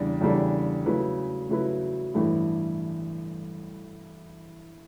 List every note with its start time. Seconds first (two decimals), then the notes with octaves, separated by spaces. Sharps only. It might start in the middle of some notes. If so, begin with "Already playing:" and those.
Already playing: E2 C#3 G3 D4
0.21 E2 C#3 G3 D4 A4
0.86 C#3 F#3 A3 E4 B4
1.49 C#3 F#3 A3 E4 B4
2.14 A1 G2 E3 A3 E4